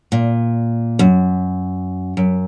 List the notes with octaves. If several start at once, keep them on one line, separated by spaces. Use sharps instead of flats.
A#2
F#2
F#2